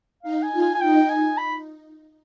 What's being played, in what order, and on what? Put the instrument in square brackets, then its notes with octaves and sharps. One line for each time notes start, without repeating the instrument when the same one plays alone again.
[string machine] D#4 [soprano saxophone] F5
[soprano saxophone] G#5
[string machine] F4
[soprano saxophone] G#5
G#5
[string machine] D#4 [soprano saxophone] G5
[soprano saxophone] G#5
B5